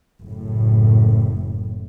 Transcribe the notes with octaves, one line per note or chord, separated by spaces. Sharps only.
F#1 A2